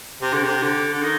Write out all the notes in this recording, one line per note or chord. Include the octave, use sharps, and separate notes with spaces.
C3
D3
C3
D3
D3
D#3